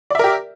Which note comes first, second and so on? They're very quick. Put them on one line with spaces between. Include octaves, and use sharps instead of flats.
D5 E5 A#4 G4